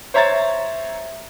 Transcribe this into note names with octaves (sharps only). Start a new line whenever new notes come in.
C5 C#5 E5 A#5 G#6 A6